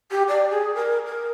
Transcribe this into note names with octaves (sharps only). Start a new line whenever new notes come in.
G4
D5
G#4
A#4
A#4